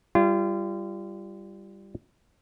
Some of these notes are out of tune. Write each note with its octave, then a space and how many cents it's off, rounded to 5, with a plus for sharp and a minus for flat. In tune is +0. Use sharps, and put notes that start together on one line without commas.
G3 +0 F4 -35